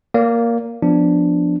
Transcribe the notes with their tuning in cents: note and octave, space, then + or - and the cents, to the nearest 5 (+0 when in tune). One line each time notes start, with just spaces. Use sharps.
A#3 +0 D5 -35
F3 +0 B3 +0 D4 +0